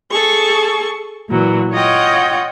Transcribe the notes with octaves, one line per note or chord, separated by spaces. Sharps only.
G#4 A4 C#6
A#2 E3 F#3
F4 C#5 D#5 F#5 G5